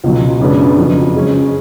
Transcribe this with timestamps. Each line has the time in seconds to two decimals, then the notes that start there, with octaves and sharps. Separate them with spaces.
0.04 C#2 B2 F#3
0.40 F#2 C#3 G#3 B3 D4
0.77 F2 C#3 F#3
1.14 C#3 G#3 C#4